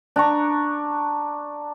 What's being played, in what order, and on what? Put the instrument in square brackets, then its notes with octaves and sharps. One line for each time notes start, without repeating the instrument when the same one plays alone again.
[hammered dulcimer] D4 A#5 C#6